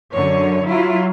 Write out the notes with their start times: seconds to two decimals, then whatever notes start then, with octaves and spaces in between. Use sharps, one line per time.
0.14 F#2 D3 C#5
0.65 F#3 E4 F4